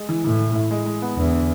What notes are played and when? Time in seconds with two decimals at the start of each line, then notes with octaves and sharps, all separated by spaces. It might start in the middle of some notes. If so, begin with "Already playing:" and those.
Already playing: G#3
0.09 E3
0.24 A2 E3
0.40 E3
0.55 E4
0.71 G#3
0.86 G#3
1.02 B3
1.17 E2 D3
1.33 D3